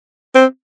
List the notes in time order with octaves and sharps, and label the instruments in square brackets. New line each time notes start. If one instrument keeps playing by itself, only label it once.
[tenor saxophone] C4